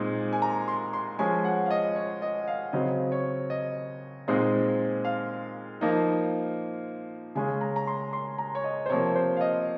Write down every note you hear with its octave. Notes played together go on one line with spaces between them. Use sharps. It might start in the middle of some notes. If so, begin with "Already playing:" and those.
Already playing: A#2 G#3 C4 D#4
G#5
A#5
C6
C6
F3 G#3 C#4 G#5
F#5
F5
D#5
C#5
D#5
F5
C#3 F#3 C4 D#5
C#5
D#5
A#2 G#3 C4 D#4
F5
F3 A#3 D#4
C#3 G#3 C#4 G#5
A#5
A#5
C6
C6
A#5
C#5
D#5
C5
C3 F3 A#3 C#5
C5
F5
D#5